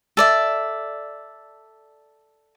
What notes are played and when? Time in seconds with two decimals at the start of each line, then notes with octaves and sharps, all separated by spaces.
0.17 A4 D5 E5